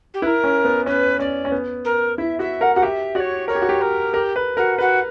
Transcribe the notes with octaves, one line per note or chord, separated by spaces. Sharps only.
G4
E4 B4
A#4
C#4
B3
C#4 B4
C#4 D5
C#4
B3
A#4
E4 E5
F#4 E5
A#4 F#5
F#4 F#5
G4 E5
F#4 C#5 D5
A#4 C#5
G4
F#4
G4
A#4
G4 A#4
B4
F#4 A#4
F#4 B4